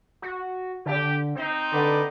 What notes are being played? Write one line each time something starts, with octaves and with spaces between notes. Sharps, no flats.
F#4
D3 G4
C4 D#4 C5
D3 B4 D5